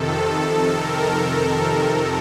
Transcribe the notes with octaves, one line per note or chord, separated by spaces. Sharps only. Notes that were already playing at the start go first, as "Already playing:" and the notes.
Already playing: F2 C3 D#3 A4
A4
A#4